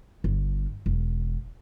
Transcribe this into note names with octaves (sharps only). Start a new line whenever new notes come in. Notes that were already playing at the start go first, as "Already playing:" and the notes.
G1
E1